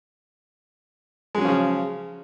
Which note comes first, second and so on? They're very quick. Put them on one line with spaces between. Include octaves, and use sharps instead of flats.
G#3 F#3 C#4 F3 C#3